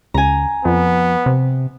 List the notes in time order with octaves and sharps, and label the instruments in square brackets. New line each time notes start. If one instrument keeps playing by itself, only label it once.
[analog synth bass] C#2 [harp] G#5 A#5
[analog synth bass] F2 [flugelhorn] B3
[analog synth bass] C3